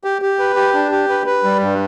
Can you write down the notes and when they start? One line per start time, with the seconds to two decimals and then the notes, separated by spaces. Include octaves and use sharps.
0.04 G4
0.22 G4
0.39 B4
0.56 G4
0.74 D4
0.92 G4
1.09 B4
1.26 B4
1.44 G3
1.60 G2